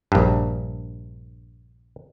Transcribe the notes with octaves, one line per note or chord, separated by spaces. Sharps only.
A#1 G2